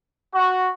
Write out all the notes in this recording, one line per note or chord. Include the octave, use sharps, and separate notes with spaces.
F#4